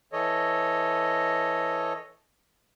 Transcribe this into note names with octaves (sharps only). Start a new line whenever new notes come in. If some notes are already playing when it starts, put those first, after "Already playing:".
E3 A4 C#5 D#5